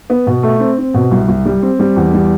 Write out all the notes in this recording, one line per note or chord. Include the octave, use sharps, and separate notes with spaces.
B3
B2
A3
C4
C4
B2
C2
C2
G3
C4
G3
E2
G3